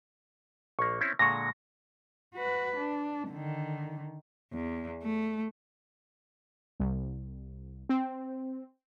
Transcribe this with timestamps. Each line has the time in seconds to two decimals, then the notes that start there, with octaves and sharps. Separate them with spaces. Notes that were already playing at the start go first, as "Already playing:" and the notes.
0.79 A#1 A#3 C#6
1.01 C4 C#4 E4
1.19 A#2 D3 G#3 C#6 A#6
2.35 F#4 B4
2.76 D4
3.29 D3 D#3
4.52 E2
5.03 A3
6.80 C2
7.89 C4